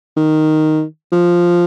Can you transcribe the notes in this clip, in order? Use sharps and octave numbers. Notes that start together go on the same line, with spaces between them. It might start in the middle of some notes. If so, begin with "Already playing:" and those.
D#3
F3